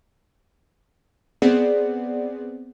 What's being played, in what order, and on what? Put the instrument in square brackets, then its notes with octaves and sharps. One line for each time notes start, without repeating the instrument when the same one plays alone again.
[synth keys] B3 C4 G#4 D5 F#5